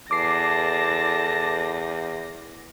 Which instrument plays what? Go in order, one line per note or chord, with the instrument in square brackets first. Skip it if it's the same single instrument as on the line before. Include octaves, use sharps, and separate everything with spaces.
[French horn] E2 [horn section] A4 D5 A5 [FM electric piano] D6 C7 [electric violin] A#6